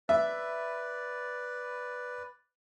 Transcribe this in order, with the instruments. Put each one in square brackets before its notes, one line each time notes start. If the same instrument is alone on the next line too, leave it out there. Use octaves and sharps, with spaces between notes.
[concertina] B4 D5 [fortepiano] E5